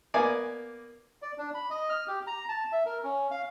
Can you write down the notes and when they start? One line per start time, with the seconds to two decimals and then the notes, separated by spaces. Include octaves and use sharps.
0.14 A#3 B3 D5 G#5 A#5
1.22 D5
1.38 D4
1.54 B5
1.70 D#5
1.90 F6
2.08 G4
2.27 A#5
2.49 A5
2.72 E5
2.86 A#4
3.04 C#4
3.31 F5